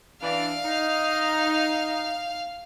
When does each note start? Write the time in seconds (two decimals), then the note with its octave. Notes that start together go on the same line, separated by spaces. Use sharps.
0.22 E3 D4 F5
0.65 D#4